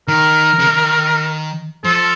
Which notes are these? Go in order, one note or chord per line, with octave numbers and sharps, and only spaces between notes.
D#3 A#4
C#3
D#3
F3 A4